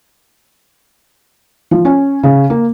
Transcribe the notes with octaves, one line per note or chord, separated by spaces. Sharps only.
F3
C#4
C#3
A#3